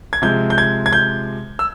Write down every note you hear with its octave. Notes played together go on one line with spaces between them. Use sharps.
G#6
C3 F3 G#3 G6
G6
G#6
G#6
G6
E6